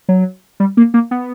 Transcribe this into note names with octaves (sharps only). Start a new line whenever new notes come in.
F#3
G3
A#3
A#3
B3